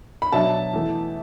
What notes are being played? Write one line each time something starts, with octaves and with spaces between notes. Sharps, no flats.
B5
B2 F#3 D4 E5 A5
E2 E3 A3